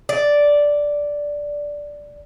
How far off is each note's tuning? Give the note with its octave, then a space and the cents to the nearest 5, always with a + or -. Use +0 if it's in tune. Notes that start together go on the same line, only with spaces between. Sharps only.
D5 -5